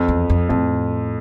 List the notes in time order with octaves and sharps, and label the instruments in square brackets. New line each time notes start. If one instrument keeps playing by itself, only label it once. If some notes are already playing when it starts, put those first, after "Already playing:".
Already playing: [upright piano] F2
[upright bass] E2
F2
[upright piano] F2 [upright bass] A2